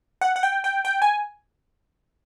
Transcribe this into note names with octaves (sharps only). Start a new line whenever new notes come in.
F#5
F#5
G5
G5
G5
G#5